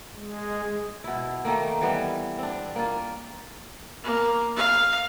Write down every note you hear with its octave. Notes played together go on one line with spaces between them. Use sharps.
G#3
B2 E4
D#3 A3 A#3
E3 G3 B3
C4 D4
A#3 F4
A#3
F5